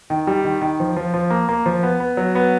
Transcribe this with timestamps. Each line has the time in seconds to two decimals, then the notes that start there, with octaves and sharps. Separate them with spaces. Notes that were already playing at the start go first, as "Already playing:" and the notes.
0.10 D#3
0.27 G3
0.45 D#3
0.61 D#3
0.80 F3
0.97 F3
1.14 F3
1.30 A#3
1.49 A#3
1.66 F3
1.83 B3
2.00 B3
2.17 F#3
2.35 B3